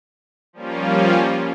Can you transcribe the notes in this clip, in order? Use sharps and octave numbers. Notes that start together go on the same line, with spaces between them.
F3 G3 A#3 C#4 F4